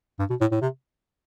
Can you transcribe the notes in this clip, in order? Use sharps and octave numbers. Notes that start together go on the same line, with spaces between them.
G2
B2
A2
A2
C3